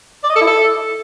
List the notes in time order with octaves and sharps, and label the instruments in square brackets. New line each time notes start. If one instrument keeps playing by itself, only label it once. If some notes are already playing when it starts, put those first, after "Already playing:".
[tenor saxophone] D5
D#5
A4
E4
A4